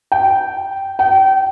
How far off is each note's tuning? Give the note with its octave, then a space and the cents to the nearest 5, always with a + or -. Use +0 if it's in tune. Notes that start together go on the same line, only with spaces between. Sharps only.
G5 -10
G5 -30